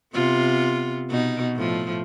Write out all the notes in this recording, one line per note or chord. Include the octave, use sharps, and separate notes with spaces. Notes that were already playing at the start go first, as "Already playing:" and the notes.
C3 B3 F4
B2 D#4
A2 F3